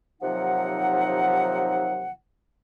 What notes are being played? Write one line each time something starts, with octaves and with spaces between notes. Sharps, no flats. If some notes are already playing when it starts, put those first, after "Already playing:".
D#2 C3 F3 F#3 D#4 F#5